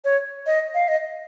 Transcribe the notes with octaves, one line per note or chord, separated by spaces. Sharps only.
C#5
D#5
F5
D#5